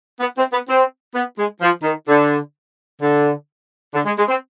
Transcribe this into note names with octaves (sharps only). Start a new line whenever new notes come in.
B3
C4
B3
C4
B3
G#3
F3
D#3
D3
D3
D3
G#3
G#3
C4